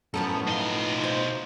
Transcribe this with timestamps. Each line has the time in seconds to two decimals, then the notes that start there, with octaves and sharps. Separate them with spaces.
0.14 F#2 A2 F3 B3 A4
0.48 B2 D#4 F4 C6
1.04 C5